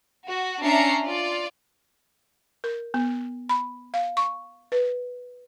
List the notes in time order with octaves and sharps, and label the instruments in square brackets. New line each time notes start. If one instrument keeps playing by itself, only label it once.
[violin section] F#4
C#4 D4 E5 A#5 C7 C#7
F4 D5
[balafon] A#4
B3
B5
F5
C#6
B4